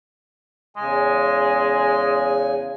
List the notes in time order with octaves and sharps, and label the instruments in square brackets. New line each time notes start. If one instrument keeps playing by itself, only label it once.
[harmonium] E2 C#3 G#5 [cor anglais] G#3